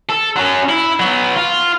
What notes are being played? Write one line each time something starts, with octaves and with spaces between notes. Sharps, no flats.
A4
F#3 C#4
E4
F#3 B3
F4